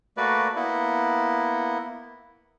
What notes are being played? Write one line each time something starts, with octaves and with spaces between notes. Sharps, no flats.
A3 A#3 F#4 B4 D5
A#3 B3 E4